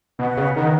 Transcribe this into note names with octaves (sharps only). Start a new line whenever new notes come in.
B2 B4 D#5 F#5
C#3
D#3 B4 D#5 F#5